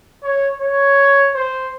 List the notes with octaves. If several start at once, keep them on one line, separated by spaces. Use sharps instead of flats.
C#5
C#5
C5